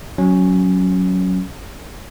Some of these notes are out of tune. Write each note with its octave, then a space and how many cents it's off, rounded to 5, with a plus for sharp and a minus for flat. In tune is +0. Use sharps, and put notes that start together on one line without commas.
F#3 +0 C#4 +0